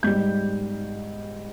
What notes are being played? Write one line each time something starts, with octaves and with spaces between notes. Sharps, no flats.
G#2 G3 G6